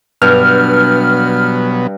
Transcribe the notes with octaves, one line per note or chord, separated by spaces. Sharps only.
G2 B2 F#3 B3 F6